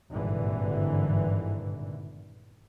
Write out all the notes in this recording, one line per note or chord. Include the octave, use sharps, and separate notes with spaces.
G#1 G2 A#2 D3 E3